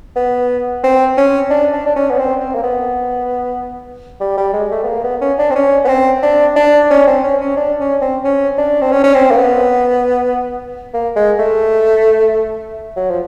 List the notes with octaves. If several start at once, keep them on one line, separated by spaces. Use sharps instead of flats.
B3
C4
C#4
D4
D4
D4
C#4
B3
C4
C4
A#3
B3
G3
G3
G#3
A3
B3
A#3
B3
C#4
D4
C4
C#4
B3
C4
D4
D4
C#4
C4
C#4
C#4
D4
C#4
C4
C#4
D4
C4
C#4
C#4
C4
A#3
B3
A#3
G#3
A3
F#3
F3